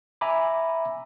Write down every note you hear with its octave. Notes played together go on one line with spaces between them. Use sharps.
E5 G#5 A#5 B5 D6